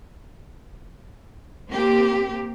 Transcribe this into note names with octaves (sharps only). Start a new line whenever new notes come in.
A#3 C4 G4